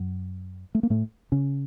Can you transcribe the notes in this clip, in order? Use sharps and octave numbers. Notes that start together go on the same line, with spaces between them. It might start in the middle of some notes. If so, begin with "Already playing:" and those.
Already playing: F#2 F#3
A3
A#3
A2 A3
C#3 C#4